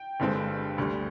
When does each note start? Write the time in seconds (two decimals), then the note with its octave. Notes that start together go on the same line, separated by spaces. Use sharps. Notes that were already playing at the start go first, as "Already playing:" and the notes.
Already playing: G5
0.20 G1 G2 D3 G#3 C4
0.78 D2 D3 G3